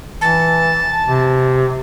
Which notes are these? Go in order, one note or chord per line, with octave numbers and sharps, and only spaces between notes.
E3 A5
C3